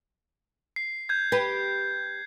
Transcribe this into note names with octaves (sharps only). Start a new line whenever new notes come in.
C7
G6 G#6
G4 B4